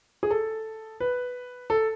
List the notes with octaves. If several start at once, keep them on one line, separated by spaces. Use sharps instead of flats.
G#4
A4
B4
A4